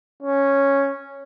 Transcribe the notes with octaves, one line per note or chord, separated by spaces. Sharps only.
C#4